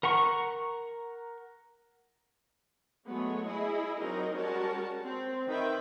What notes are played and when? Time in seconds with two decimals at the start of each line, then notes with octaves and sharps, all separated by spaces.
0.03 A#4 F#5 A#5 C#6
3.07 F#3 G#3 A3 B3 C#5
3.46 E4 G#4 D#5
4.00 F#3 C4 D#4 A#4 D#5
4.34 G3 G#3 C#4 F#4 A#4 A5
5.05 C4
5.47 D#3 B4 E5 G5